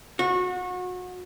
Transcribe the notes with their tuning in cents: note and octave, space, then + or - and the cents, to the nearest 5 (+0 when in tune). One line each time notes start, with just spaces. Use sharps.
F#4 -30